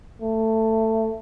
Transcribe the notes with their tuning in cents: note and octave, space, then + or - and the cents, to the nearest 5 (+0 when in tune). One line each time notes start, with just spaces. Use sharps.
A3 +15